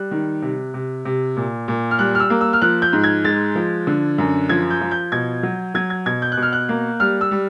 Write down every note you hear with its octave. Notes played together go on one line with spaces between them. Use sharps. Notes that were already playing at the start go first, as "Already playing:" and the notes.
Already playing: G3 F#6
D#3
C3
C3
C3
A#2
A#2
F6
G3 F#6
F6
E6
A#3
E6
F6
F3 F#6
G6
G#2
G#6
G#3 A6
F3
D3
F#2
F3 G#6
G6
F3
G6
B2 G#6
F#3
F#3 G#6
G#6
B2 G#6
G6
F#6
B2
F6
F#6
A#3
G3 F6
E6
G3